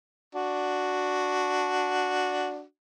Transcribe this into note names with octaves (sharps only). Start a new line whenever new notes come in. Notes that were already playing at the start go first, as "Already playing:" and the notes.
D4 F#4